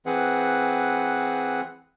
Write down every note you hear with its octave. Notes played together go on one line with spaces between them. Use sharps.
E3 C4 G#4 B4 F#5